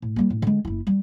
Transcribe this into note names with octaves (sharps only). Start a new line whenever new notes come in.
A2
G3 A#3
A2
D3 G#3
F#1 E4
G3